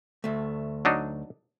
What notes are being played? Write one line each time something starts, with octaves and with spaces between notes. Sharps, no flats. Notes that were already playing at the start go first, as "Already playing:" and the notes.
D2 A3
F#3 D4 D#4